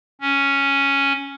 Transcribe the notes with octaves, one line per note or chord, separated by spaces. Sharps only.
C#4